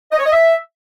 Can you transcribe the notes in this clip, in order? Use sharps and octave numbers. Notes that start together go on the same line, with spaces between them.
D#5
C#5
D#5
E5